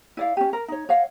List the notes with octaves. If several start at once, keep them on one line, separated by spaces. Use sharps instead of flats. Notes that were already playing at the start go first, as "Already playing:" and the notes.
E4 D5 F5
C#4 G4
A#4
D#4 C#5
C#5 D#5 F5 F#5